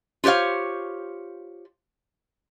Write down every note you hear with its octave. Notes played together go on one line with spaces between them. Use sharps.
F4 G4 C5 C#5 F5